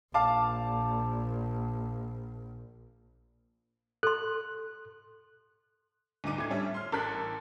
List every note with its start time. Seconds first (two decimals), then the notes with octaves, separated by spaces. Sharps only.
0.14 A#1 F5 A5 D6
4.03 A4 C6 F#6
6.24 D2 G2 D#4 D6 D#7
6.38 A2 G#6
6.50 G3 C#4 D4 E5
6.74 C6 F6
6.92 A1 A4 A#4 F#6 B6